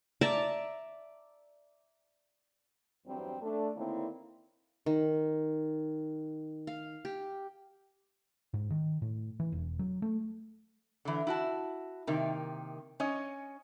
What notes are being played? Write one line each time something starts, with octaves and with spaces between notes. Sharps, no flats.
D5 E5 A5 A#5
E2 G2 F#3 G3 C4
A3 D4
D3 D#3 A#3 C4 E4 C#5
D#3
F5
G4
G#2
D#3
A2
E3
E1
F#3
A3
D3 E3
E4 F#4 A5
C3 D#3 A#3
C#4 C#5 D#5